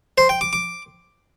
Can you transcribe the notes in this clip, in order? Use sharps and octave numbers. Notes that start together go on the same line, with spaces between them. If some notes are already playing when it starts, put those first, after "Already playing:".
C5
G5
D6
D6